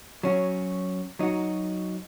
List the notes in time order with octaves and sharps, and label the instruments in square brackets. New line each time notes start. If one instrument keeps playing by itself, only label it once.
[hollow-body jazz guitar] F#3 C#4 F#4
F#3 D#4 F#4